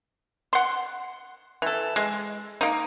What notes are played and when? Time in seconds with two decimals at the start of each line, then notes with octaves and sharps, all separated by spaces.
0.53 F#5 C6
1.62 E3 A4
1.96 G#3
2.61 A#3 D#4